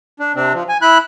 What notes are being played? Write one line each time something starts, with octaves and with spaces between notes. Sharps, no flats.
D4
C3 C4 D4
F3
G#5
E4 B5 F#6